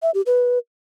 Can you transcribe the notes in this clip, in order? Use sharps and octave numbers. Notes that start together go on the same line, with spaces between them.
E5
G4
B4